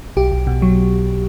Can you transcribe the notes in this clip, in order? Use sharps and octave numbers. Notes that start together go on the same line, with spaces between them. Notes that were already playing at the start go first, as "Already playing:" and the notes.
B1 G4
B1
B2
F#3